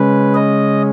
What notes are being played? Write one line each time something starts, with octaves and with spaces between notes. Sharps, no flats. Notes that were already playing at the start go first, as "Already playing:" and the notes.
Already playing: C#3 G#3 C#4 B4
D#5